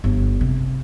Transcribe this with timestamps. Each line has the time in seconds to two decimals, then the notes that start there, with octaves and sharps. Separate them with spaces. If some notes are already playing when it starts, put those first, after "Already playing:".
0.04 G1
0.41 C3